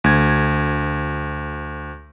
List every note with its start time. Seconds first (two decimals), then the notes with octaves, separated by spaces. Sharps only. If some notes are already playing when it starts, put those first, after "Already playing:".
0.04 D2 G#6